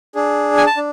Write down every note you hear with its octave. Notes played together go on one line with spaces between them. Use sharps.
D4 G#4
G#5
A5
D4